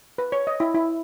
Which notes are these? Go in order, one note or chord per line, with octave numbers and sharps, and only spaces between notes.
B4
C#5
D#5
E4
E4